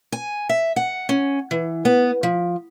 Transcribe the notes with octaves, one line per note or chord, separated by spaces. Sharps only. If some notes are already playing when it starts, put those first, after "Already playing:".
G#5
E5
F#5
C#4
E3
B3
F3